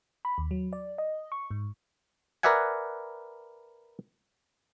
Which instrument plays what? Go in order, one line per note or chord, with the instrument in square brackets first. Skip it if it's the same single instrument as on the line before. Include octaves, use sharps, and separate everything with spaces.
[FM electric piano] B5
D#2
F#3
D5
D#5
C#6
G#2
[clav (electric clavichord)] A#4 B4 D5 E5 F#5 G#5